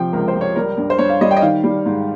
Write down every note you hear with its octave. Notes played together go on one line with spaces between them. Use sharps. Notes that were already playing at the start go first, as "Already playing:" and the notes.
Already playing: C3 F3 G5
C#2 A#4
C5
C#2
C#5
G3 A#4
G2
C5
G2 C#5
F5
G3 D#5
G5
D#5
D#3 F5
G3
G#2